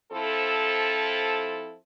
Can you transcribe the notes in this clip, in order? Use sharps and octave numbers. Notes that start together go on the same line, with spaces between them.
F3 C4 E4 A4